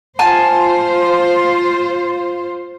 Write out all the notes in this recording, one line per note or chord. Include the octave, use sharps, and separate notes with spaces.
F4 C5 G#5 A5 F6